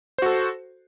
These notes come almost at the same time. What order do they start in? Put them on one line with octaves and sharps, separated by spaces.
C5 F#4 A4